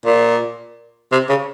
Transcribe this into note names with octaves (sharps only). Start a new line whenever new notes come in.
A#2
C3
C#3